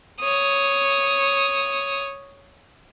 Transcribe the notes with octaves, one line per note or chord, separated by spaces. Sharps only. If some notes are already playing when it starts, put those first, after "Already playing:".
C#5 D#6